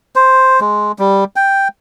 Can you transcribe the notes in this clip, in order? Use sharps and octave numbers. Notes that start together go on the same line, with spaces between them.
C5
G#3
G3
G5